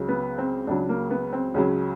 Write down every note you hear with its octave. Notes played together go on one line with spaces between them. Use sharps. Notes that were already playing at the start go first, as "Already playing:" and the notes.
Already playing: C#2 C#3 F#3
B3
C4
C#2 C#3 F#3 D4
A#3
B3
C4
C#2 C#3 F#3 C#4